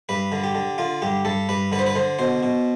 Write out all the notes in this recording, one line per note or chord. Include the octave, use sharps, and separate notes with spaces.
G2 B4
D3
G4
D3
D3 F4
G2 G4
G2 A4
G2 B4
D3 B4
C5
B4
D3 C5
B2 C5
B2